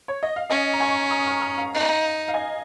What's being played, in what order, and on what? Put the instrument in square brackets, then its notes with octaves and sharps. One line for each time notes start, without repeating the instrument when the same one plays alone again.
[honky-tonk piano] C#5
D#5
F5
[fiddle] C#4 [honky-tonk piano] D#5 G#5
[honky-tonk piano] A#5
G#5 C#6
A#5 D#6
C#6 F6
A#5 D#6
F5 A#5
[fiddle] D#4
[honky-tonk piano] F5
D#5 G#5